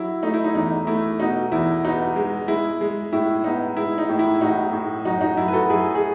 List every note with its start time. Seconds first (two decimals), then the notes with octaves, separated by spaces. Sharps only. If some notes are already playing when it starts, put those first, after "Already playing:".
Already playing: F#3 E4
0.23 A3 D#4
0.34 E4
0.44 D#4
0.55 E2 D#4
0.87 A3 E4
1.20 B2 D#4 F#4
1.52 E2 E4
1.84 B3 D#4 F#4
2.16 G#3
2.48 G#3 E4
2.81 G#3
3.13 A2 E4
3.44 B3 D#4
3.77 G#3 E4
3.98 D#4
4.09 A2
4.19 E4
4.41 A2 D#4 F#4
4.73 A2
5.05 F#2 D#4 F#4
5.21 D#4 F#4
5.37 F#2 E4
5.48 B4
5.53 F#4 A4
5.70 F#2 E4 G#4
5.95 G#4